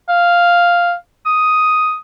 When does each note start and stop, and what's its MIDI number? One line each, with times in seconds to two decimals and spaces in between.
0.09 0.93 77
1.26 1.96 87